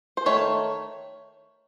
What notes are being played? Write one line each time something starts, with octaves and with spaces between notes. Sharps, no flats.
C5
D#3 A3 C#5